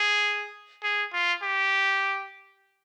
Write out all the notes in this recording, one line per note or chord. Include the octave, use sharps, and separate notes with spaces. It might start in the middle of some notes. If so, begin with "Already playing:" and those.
Already playing: G#4
G#4
F4
G4